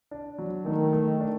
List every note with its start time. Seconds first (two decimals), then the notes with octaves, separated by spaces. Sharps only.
0.11 D4
0.38 F#3
0.65 D#3 A3
0.93 A3
1.20 D4